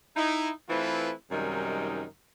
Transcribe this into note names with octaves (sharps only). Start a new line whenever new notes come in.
D#4 E4
E3 A3 C4 E4 F4 B4
F#2 C3 D#3 G3 G#3 D#4